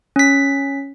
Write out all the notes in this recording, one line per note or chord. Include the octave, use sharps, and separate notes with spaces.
C#4 B6